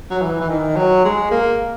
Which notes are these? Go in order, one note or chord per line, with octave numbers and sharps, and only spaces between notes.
F#3
E3
E3
D#3
F#3
G#3
A#3